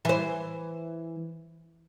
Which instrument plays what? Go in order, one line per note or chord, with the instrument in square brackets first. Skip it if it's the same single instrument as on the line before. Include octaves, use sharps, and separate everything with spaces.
[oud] E3 C5